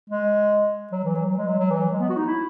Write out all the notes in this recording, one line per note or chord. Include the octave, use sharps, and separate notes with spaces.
G#3
F#3
E3
F#3
F#3
G#3
F#3
F#3
E3
F#3
G#3
B3
F#4
D#4
E4